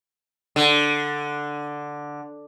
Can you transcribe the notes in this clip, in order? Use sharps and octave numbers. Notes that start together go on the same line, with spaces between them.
D3